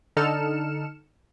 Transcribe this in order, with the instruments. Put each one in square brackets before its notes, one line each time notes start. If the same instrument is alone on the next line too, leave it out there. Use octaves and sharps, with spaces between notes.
[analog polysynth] D3 D#4 A4 F6 C#7 E7